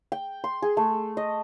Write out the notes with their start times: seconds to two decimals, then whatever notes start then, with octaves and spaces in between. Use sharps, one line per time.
0.12 G5
0.44 C6
0.62 G#4
0.77 A3
1.17 D#5